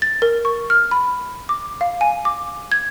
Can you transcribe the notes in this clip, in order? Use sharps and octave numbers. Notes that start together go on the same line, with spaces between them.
A6
A#4
C#6
F6
B5
D6
F5
G#5
D6
G#6